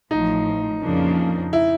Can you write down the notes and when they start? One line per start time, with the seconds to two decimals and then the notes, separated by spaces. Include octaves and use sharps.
0.11 A1 A2 F3 D#4
0.82 F2 C#3 F3 A#3 D4
1.53 E4